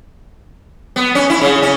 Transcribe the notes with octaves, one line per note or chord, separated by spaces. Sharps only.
B3
C#4
E4
C#3
C#4